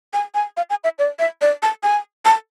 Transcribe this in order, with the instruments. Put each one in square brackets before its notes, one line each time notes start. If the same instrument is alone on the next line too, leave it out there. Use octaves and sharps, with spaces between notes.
[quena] G#5
G#5
F5
G#5
E5
D5
E5
D5
A5
G#5
A5